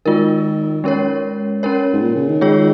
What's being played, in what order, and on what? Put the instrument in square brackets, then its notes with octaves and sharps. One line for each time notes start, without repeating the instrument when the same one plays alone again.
[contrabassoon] D#3 [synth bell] G#3 F4 A#4
[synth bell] G#3 C#4 A#4 C#5
C#4 A#4 C#5
[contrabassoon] G#2
A#2
C#3
D#3
[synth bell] G#3 F4 G#4 C#5